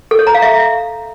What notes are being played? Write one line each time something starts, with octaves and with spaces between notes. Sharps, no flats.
A4
C#5
A#5
F5
E5